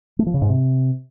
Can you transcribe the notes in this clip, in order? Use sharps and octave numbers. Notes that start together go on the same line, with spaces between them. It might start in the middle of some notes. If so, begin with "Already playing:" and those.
A3
F3
C#3
G#2
C3